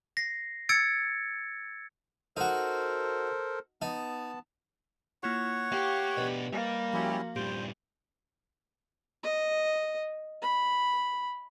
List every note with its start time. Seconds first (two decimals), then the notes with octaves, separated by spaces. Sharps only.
0.17 A#6 C7
0.69 E6 G#6 A6 C#7 D7
2.37 D#4 F#4 A4 A#4 C5
3.82 B3 D#4 A5
5.23 A#3 E4 F4 C#5 F#5 C#6
5.72 A#3 G4 F5
6.17 B2 D4 B4 D#5
6.53 G3 A#3
6.93 F3 C#4 E4 F#4 G4
7.36 G2 A#2 G4 C5
9.23 D#5
10.42 B5